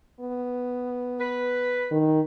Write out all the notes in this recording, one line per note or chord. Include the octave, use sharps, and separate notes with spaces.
B3
B4
D#3